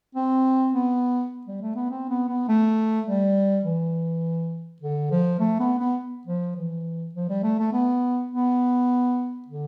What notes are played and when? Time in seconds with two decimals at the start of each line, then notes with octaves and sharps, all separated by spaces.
0.15 C4
0.74 B3
1.47 G3
1.61 A3
1.75 B3
1.90 C4
2.10 B3
2.29 B3
2.49 A3
3.07 G3
3.65 E3
4.82 D3
5.11 F3
5.40 A3
5.60 B3
5.79 B3
6.27 F3
6.56 E3
7.15 F3
7.30 G3
7.43 A3
7.59 A3
7.73 B3
8.32 B3
9.48 D3